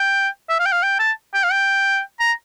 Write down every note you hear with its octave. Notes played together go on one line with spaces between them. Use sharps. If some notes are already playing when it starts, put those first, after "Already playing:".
Already playing: G5
E5
F5
G5
F5
G5
A5
G5
F5
G5
A#5